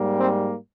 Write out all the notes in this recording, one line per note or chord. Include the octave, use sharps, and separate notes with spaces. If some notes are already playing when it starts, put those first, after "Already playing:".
Already playing: G#2 G3 A#3
C4